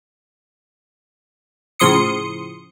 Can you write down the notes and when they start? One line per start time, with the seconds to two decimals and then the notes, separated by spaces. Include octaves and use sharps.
1.79 A2 C#3 F3 C6 D#6 C#7